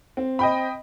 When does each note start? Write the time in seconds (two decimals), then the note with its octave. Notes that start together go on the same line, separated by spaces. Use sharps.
0.17 C4
0.39 D#5 G5 B5